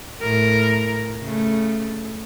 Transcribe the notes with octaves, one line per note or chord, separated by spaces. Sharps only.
A2 A#4
C#3 A3